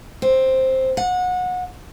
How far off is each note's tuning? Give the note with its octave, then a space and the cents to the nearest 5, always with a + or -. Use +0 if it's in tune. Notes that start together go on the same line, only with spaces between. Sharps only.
C4 +5
F#5 -25